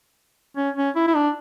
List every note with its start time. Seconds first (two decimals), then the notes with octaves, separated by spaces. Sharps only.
0.57 C#4
0.77 C#4
0.96 E4
1.07 E4
1.16 D4